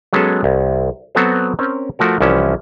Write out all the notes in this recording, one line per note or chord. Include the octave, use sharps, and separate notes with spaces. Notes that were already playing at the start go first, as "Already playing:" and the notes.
F#3 G#3 B3 C#4 G#4 A4
C2
F#3 B3 C4 F#4 A4 C5
C4 C#4 A#4 C#5
F3 A3 F#4 A#4
C2 E3 F3 C#4 E5